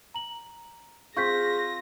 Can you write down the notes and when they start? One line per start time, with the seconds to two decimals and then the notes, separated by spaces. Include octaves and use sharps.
0.14 A#5 F#7
1.17 C4 F4 G#4 C#6 G6 A#6 B6